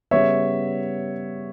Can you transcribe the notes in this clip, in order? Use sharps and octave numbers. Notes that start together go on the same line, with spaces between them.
C#3 G3 B3 C#5 E5